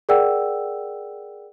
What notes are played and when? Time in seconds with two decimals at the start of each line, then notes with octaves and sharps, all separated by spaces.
0.09 G#4 A#4 D5 F#5 G5 E6